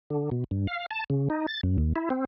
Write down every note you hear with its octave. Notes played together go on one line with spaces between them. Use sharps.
D3
B2
G2
F5
A5
C#3
D#4
A6
F#2
D#2
E4
C4